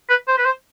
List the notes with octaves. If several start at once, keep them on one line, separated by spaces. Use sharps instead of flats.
B4
C5
B4
C5